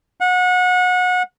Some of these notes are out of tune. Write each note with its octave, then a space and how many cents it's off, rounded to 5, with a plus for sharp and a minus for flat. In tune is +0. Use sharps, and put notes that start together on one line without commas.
F#5 -30